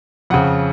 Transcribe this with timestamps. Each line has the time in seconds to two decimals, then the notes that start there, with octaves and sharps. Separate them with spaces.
0.30 F2 C#3 F#5